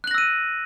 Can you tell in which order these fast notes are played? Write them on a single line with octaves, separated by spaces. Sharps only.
F#6 F#7 A#6 E6 D#7